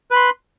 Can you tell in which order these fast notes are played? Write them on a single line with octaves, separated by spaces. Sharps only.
B4 B5 C6